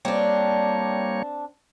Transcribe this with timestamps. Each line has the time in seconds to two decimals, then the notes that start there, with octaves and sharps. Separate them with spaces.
0.05 G3 A#3 C4 D4 C#5